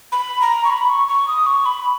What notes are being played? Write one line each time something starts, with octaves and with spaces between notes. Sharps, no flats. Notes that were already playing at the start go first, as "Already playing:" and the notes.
B5
A#5
C#6
B5
C#6
C#6
D#6
C#6
B5